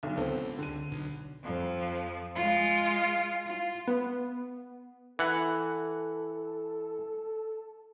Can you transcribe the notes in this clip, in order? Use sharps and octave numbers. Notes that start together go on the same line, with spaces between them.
B1 D3
C#2 B3 C4 A4
D3 D#7
B1
F2 F3
G#3 F4
F4
B3
E3 A4 F#5